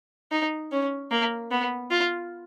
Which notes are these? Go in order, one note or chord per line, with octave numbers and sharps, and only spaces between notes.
D#4
C#4
A#3
B3
F4